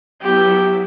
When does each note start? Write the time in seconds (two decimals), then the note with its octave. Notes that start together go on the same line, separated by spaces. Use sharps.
0.21 F#3 B3 E4 G4